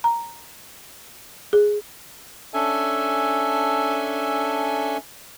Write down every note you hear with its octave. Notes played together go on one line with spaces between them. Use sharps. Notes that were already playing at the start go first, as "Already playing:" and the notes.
A#5
G#4
C#4 D4 A4 E5 G#5